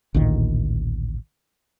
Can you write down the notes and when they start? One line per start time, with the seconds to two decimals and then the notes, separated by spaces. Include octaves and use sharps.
0.14 A1 D2 A#2 D#3